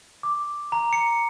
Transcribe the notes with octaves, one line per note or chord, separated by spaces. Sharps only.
D6
A#5
C#7